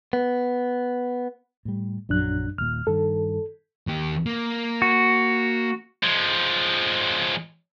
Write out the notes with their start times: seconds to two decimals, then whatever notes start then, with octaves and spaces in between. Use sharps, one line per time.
0.13 B3
1.65 A2 G3
2.09 A#1 F#2 F#3 D4 F#6
2.58 D#1 A#2 F6
2.87 G2 D#3 A4
3.87 D#2 G4
4.26 A#3
4.82 F#4
6.03 F3 G#3